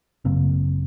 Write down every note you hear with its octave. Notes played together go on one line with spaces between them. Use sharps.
G#1 F#2 C#3 A#3 C4